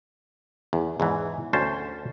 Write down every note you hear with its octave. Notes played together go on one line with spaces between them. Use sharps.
E2
E2 G#2 E3
D2 C#4 C5 A5